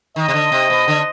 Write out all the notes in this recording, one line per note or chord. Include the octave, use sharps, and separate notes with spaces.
D#3 D#5
C3
D3
C3
B2
D3